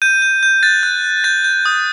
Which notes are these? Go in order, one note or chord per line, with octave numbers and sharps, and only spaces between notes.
G6 D#7
G6
G6
F#6 A6
F#6
F#6
G6 A6
G6
D#6